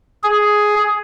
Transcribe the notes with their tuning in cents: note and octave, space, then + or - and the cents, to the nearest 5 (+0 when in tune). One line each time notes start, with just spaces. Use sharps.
G#4 +5